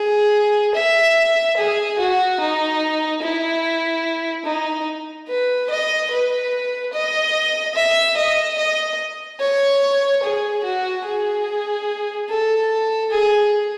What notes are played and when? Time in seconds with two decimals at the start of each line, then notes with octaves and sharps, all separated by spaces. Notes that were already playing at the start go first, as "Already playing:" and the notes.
Already playing: G#4
0.75 E5
1.57 G#4
1.98 F#4
2.40 D#4
3.22 E4
4.45 D#4
5.28 B4
5.70 D#5
6.10 B4
6.93 D#5
7.75 E5
8.17 D#5
8.58 D#5
9.40 C#5
10.22 G#4
10.64 F#4
11.05 G#4
12.29 A4
13.11 G#4